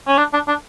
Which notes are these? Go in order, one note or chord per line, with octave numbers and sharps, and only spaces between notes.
C#4
D4
D4
D4